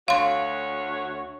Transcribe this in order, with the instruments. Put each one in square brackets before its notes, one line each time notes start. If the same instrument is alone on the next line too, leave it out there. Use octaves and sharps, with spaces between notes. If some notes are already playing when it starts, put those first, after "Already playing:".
[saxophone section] D2 F#4 C#5 [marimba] F5 C6